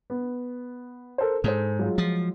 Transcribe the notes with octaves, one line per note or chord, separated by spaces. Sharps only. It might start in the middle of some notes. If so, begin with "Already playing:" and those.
B3
A4 A#4 C5
G#2 G#4 A4 C5
F#3 G#3 F4
F3